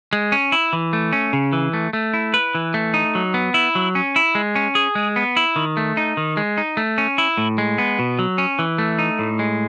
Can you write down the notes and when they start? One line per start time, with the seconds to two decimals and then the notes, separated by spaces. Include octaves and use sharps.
0.13 G#3
0.32 C#4
0.52 E4
0.73 E3
0.93 A3
1.13 C#4
1.33 C#3
1.53 E3
1.73 A3
1.93 A3
2.14 E4
2.34 B4
2.55 E3
2.74 A3
2.94 D#4
3.15 F#3
3.34 B3
3.54 E4
3.75 F#3
3.95 C#4
4.16 E4
4.35 G#3
4.56 C#4
4.75 G#4
4.95 G#3
5.16 B3
5.37 E4
5.56 D#3
5.77 A3
5.97 D#4
6.17 D#3
6.37 G#3
6.58 D#4
6.77 A3
6.98 C#4
7.18 E4
7.38 A2
7.58 G#3
7.78 B3
7.99 B2
8.19 F#3
8.38 C#4
8.59 E3
8.78 A3
8.99 D#4
9.19 A2
9.39 G#3